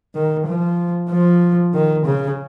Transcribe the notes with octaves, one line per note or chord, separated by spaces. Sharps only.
D#3
F3
F3
D#3
C#3